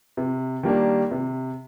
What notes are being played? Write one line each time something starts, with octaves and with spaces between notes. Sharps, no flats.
C3
D#3 G3 A#3 D4
C3